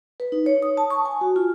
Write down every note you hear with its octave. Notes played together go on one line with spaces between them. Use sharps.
B4
D#4
C#5
D#6
A5
C#6
G#5
F#4
F4